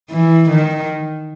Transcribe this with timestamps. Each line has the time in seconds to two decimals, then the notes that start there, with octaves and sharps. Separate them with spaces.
0.11 E3
0.50 D#3